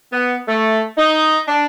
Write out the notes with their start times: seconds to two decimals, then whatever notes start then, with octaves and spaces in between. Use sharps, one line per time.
0.13 B3
0.48 A3
0.97 D#4
1.47 D4